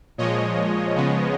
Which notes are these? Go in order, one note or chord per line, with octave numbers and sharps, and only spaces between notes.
A#2 F3 G#3 C#5 D#5
C#3 F3 G#3 B3